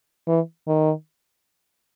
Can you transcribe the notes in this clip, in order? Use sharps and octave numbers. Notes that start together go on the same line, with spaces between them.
E3
D#3